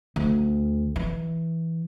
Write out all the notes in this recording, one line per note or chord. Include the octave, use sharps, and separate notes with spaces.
D2
E3